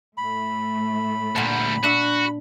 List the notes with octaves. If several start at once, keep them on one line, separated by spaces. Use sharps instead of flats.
A2 A3 B5
D2 A#2 G3 B3 A5
D4 F#4 E5